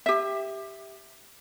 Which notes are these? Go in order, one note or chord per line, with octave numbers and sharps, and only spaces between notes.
G4 E5